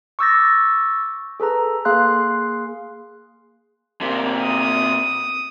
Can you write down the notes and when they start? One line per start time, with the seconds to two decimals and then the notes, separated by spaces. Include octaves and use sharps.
0.19 C#6 D6 E6 G6 A6 A#6
1.40 G#4 A4 B4 A#5
1.85 A#3 G#4 F5 C6 F#6
4.01 C3 A#3
4.41 D#6